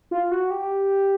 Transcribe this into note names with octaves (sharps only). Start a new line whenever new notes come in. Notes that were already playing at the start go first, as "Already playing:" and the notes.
F4
F#4
G4